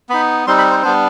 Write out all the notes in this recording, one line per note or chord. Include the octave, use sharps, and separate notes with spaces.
B3 D#4 B5
G3 C4 D#4 C6
B5
C5
G3 B3 D4 C5